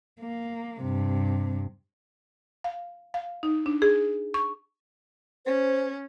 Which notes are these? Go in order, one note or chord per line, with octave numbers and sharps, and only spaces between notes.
A#3
G2 C3
F5
F5
D#4
D4
G#4
C#6
C#4 C5